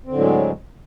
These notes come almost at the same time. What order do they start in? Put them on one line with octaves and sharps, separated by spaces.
C4 D3 A2 F#3 G#3